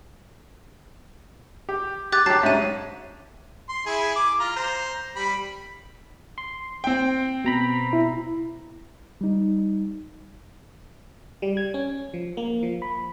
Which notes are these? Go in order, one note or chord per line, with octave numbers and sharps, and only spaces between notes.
G4
G4 D6 F#6 A6
F#3 G4 A5 A6 C7
G#2 C#4 E5 D#7
C6
E4 G#4 G#5
D6
F4 A#5
C5 A#5
G3 G4 B5
C6
C4 G5
B2 A#5 B5
E4
G3 D#4
G3
G#6
C#4
F3
A#3
F3
B5